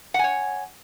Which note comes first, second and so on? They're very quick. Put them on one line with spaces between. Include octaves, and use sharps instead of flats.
F#5 G#5 C#5